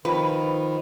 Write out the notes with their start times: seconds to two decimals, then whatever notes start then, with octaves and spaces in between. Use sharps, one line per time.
0.05 D#3 F3 B4